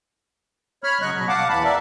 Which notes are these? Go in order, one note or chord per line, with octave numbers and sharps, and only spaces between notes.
C#5 B5 F6
C#3 F#3 D#5 C#6 F#6
B2 F#3
F5 F#5 A5 D6
E2 E3 A5 B5
A#4 D5 E5